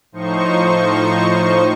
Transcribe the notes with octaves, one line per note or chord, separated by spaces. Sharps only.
A2 F3 D#4 C5 C#6